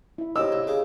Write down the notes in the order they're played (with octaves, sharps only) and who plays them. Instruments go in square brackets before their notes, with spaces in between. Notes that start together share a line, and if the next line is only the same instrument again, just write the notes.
[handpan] E4 E5
[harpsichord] C3 [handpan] G4 C#5 D#5 [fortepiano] E6
[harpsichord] C2
C#3